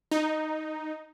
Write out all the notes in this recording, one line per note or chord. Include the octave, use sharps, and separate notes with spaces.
D#4